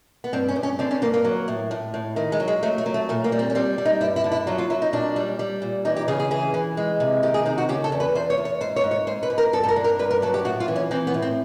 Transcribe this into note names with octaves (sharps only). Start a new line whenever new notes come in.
B3
G2 C4
C#4
G2
C#4
D3 C4
C#4
G2 A#3
A#3
F#3
A2
A2
A2
D#3 A3
G#3
F#3
G#3
F#3 A3
A3
F#3
A3
A#2 A3
A#3
G3
C4
C#4
G3 C4
G3
D#4
G2 E4
E4
D3
E4
F#3 F4
F4
F#3 E4
D#4
A#2 D4
G3
G3
A#2
E3 D#4
G4
C#3 G#4
G#4
E3 G#4
E3
G#3
C3
D#3 G4
G#4
C3 D#4
F#4
C#3 G4
A4
E2
B4
E2 C5
C#5
E2
C#5
G#2 C5
C#5
G#2
C#5
G#2 C5
B4
G#2
A#4
G2 A4
A4
A#4
D3
A#4
G2 B4
A#4
F#3 A4
G4
A2 F#4
F4
E3
C#4
E3 C4
B3
A2
C4